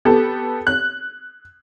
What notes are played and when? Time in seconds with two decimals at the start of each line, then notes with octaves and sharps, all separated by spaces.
0.05 B3 G4 A4
0.67 F#6